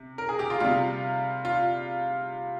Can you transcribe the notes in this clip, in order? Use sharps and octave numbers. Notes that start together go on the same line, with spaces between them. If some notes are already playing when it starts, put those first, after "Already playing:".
Already playing: C3
A#4
G#4
G4
F4
C3 G3 F4
F4